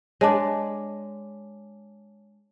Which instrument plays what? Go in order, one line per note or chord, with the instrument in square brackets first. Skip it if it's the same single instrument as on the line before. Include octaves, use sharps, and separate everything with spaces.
[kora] G#3 D4 [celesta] C#5 A5 D6